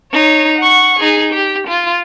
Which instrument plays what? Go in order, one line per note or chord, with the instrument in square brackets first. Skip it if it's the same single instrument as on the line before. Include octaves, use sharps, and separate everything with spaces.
[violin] D#4 C#5
F#5 C#6
D#4 G#4
G4
F4